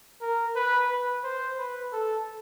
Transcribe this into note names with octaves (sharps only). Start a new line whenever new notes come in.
A#4
B4
B4
C5
B4
A4